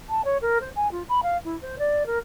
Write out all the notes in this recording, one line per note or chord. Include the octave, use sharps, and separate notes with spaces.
A5
C#5
A#4
C5
G#5
F4
B5
F5
E4
C5
D5
A#4